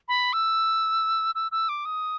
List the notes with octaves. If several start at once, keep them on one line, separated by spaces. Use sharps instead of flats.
B5
E6
E6
E6
D6
D#6